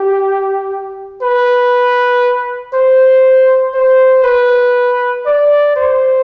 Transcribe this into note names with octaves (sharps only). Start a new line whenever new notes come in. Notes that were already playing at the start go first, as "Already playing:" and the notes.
Already playing: G4
B4
C5
C5
B4
D5
C5